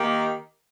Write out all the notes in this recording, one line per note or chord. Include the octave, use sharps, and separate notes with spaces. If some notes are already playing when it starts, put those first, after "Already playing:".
Already playing: D#3 A#3 G4